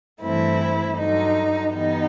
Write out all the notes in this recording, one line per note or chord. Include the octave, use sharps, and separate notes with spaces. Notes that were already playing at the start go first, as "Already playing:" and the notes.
G2 E3 A3 C4 E4
G2 D3 F#3 D#4
G2 E3 G3 B3 D#4